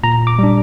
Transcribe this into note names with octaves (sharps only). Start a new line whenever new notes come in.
A#2 A#5
D6
G3 D4